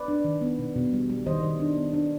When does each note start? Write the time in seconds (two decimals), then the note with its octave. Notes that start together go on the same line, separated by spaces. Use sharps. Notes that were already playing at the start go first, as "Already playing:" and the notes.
Already playing: B4 D5
0.08 D4
0.25 D#3
0.41 B3
0.59 B2
0.76 B2
0.93 G3
1.10 G3
1.26 D#3 C5 D#5
1.43 D#3
1.60 D4
1.77 B3
1.93 D4